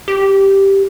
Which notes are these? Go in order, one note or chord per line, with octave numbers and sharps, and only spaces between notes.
G4